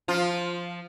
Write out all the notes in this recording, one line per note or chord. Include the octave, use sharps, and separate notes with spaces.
F3 F4